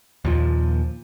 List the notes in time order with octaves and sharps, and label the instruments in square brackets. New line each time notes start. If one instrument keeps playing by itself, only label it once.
[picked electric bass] D#2 A#2 F3